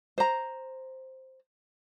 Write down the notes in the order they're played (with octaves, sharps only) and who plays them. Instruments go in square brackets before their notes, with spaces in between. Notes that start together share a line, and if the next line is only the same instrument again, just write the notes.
[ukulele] C5 A#5